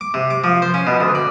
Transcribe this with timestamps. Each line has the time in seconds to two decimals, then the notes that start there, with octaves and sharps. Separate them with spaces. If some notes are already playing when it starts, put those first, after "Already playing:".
0.01 D6
0.14 C3
0.30 D6
0.44 F3
0.62 C5
0.74 C#4
0.87 B2
1.01 D2
1.15 D5